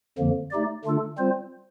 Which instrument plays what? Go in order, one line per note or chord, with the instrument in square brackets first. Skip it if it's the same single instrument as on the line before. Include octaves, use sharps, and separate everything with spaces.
[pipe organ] F2 D3 F3 A#3
A3 D#4 G4 D5
D3 A3 D4 F4 A4
G3 C4 F4 C5